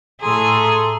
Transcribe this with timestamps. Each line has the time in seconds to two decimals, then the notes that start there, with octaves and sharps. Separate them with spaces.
0.21 A2 G#4 A4 A#5 C6